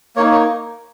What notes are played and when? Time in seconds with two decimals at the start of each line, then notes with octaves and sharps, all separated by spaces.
0.16 A#3 C#5
0.19 D#4
0.32 C#5